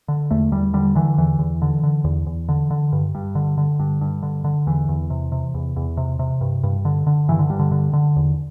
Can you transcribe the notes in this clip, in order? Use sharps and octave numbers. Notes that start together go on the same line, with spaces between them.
D3
E2 A3
E2 G3
D3 G3
D3 E3
E2 E3
E2
D3
D3
E2
E2
D3
D3
G2
G2
D3
D3
G2
G2
D3
D3
E2 E3
E2
C3
C3
E2
E2
C3
C3
G2
G2
D3
D3
G2 E3
D3
G2
D3
D3
D3
E2